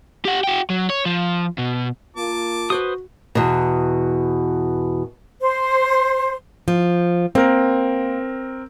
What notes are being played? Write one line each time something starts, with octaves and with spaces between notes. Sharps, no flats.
G4 F#5
F#4 G5
F#3
C#5
F3
B2
A#3 F4 A5 D6
F#4 B4 C5 D#6
E2 B2
C5
F3
A#3 C4 A#4